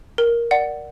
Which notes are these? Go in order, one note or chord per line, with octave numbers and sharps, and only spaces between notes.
A#4
D5 F#5